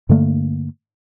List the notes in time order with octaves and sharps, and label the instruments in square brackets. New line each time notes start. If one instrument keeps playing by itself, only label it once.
[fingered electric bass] G2 D3 A3 A#3